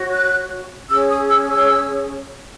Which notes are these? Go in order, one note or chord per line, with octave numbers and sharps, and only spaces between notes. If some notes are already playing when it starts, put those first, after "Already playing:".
Already playing: F#4 C#5
F#6
C#4 G#4 C#5 E6
D#6
E6
E6